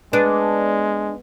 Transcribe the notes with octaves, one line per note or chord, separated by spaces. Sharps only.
G#3 B3 D4